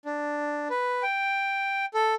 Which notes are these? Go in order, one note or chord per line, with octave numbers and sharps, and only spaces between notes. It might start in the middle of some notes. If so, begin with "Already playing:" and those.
D4
B4
G5
A4